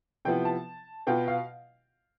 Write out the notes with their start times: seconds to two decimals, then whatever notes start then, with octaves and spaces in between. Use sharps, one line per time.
0.25 C3 F3 B3 E4 G5
0.45 A5
1.07 B2 B3 F4 G5
1.28 F5